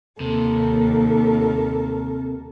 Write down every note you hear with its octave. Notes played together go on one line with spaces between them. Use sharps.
D#2 C3 A4 A#4